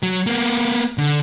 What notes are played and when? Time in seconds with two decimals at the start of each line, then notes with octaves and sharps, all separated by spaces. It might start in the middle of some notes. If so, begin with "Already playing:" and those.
0.03 F#3
0.27 A#3 B3
0.98 D3